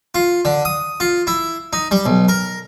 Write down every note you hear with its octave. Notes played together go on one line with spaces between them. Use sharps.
F4
D3
D#6
F4
E4
D#4
G3
B1
A#4